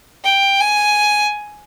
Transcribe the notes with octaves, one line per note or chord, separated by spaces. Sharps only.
G5
G#5